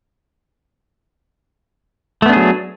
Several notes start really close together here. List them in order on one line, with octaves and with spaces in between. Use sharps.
A3 B3 D4 G#4 F#3